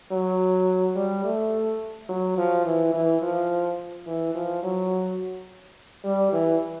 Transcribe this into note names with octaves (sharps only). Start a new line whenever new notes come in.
F#3
G3
A3
F#3
F3
E3
E3
F3
E3
F3
F#3
G3
E3